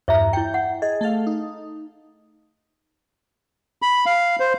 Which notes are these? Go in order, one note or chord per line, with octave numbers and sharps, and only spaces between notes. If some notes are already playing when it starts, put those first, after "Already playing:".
E2 G2 C#5 E5 A#5
E4 G5 G6
F#5
G#4 D#5
A3 A4 F5
D#4
B5
F5
C5